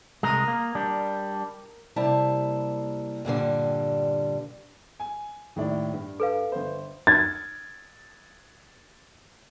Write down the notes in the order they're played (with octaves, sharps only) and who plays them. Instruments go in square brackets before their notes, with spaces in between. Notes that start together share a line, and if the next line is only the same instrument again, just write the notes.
[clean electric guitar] C2 G#3 [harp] A#4 A#5 D#6
[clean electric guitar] A#3
G3 D4
[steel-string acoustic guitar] C3 G3 A#3 E4 A5
G2 A#2 D3 G3
[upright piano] G#5
D#2 A2 D5
G2
[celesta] A4 B4 F5
[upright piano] G1 C5
[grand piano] G#6 A6